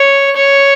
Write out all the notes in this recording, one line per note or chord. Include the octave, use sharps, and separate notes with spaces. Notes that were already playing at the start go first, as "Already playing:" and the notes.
Already playing: C#5
C#5